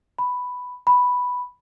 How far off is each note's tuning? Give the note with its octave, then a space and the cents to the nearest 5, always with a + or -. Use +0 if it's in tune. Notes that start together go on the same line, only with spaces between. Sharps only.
B5 +5
B5 +0